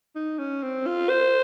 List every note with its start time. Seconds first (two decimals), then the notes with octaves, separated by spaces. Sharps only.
0.15 D#4
0.38 C#4
0.63 C4
0.87 F4
1.09 C5